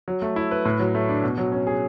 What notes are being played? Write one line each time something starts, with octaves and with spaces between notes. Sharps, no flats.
F#3
A3
E4
B4
A2
F#3
A3
D4
B2
F#3
C#4
G#4